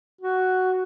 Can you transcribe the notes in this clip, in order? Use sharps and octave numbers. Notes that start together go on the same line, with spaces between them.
F#4